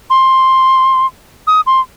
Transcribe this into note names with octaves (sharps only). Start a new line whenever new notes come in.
C6
D#6
C6